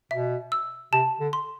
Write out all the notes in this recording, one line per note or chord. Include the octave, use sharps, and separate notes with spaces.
B2 E5
E6
C3 A5
D3
C6